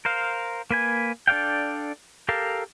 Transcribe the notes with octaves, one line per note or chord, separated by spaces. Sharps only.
A#4 C5 F5
A#3 B4 G#5
D4 A4 D5 F5 G5
G4 A4 A#4 F5